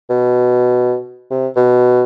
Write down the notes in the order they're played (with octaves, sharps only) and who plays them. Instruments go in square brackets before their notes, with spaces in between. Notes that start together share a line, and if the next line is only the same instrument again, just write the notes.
[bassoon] B2
C3
B2